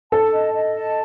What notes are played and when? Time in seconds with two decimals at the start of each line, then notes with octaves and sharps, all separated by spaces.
0.12 A4 A5
0.33 D#5
0.53 D#5
0.73 A5